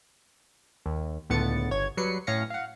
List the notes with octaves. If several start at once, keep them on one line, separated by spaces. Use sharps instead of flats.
D#2
C#2 A2 D3 B3 A6 C#7
G1 C#5 G#6
F#3 G3 B4 C7 C#7
A2 C#4 F5 A#6 C#7
F5 F#5